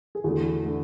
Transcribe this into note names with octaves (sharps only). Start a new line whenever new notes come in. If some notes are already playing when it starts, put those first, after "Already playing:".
G#4
E2 D3 A3 F#4
D3 A3